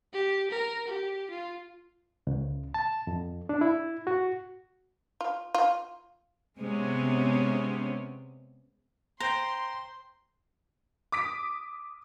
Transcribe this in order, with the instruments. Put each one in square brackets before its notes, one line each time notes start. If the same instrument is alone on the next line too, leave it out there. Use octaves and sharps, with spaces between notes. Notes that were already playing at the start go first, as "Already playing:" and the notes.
[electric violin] G4
A#4
G4
F4
[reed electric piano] C#2
A5
F2
D4
E4
F#4
[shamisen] F4
F4
[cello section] C3 G#3 B3 C#4
[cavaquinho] C5 [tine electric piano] G5 A#5 [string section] C6
[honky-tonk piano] D6 D#6 B6 D7